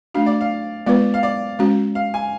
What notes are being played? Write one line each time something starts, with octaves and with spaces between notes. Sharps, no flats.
A3 D4 F#4 F5
D5
F5
G#3 B3 F4 B4 D5
F5
D5
G#3 C#4 F#4
F5
G#5